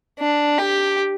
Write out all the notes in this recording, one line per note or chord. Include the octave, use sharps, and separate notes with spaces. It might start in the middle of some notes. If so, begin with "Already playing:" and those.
D4
G4